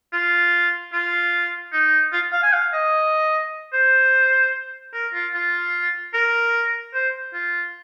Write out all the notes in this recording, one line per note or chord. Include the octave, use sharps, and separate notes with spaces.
F4
F4
D#4
F4
F5
G#5
F5
D#5
C5
A#4
F4
F4
A#4
C5
F4